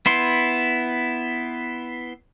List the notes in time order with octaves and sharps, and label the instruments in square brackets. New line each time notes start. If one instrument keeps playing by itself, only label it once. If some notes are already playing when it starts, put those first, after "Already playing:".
[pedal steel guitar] B3 E4 C6